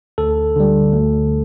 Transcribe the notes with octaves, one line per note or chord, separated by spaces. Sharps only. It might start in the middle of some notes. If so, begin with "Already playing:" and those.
D2 A4
D3 G3
D2